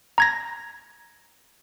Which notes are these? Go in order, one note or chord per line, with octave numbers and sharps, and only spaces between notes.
A#5 G#6 A#6